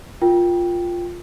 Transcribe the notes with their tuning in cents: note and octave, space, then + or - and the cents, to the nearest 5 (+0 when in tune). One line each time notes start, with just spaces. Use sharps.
F4 +0 A#4 +5 G5 +0